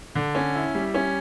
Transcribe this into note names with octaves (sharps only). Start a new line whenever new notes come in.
D3
C#4
E4
G3
C#4